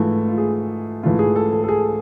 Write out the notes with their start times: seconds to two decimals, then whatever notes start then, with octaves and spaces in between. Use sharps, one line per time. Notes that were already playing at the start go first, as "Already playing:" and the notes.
Already playing: G#2 E3 A3 F4
0.28 F4
0.38 G#4
1.03 G#2 E3 A3 F4
1.19 G#4
1.36 A4
1.53 A4
1.63 A4
1.69 G#4